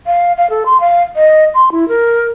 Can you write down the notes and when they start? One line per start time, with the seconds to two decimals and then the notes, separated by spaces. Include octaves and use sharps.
0.07 F5
0.37 F5
0.50 A4
0.66 C6
0.80 F5
1.16 D#5
1.55 C6
1.72 E4
1.88 A#4